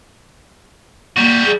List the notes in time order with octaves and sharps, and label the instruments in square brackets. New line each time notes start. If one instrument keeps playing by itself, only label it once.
[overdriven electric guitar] G3 F#4 [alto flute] A#3
[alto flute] G#4